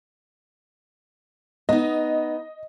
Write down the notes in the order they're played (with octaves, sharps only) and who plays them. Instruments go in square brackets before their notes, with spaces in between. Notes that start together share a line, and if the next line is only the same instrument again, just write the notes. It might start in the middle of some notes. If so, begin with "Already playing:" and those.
[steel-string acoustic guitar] B3 D#4 [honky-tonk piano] D#5